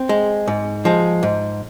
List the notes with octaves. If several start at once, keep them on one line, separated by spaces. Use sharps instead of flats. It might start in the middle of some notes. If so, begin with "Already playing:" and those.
Already playing: C4
G#3
G#2
F3 G#3
G#2